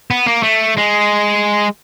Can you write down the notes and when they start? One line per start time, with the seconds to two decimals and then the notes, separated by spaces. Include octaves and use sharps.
0.11 B3
0.26 A#3
0.43 A3
0.77 G#3